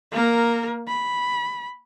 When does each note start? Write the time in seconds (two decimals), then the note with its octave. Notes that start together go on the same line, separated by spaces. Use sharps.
0.12 A#3 A#4
0.88 B5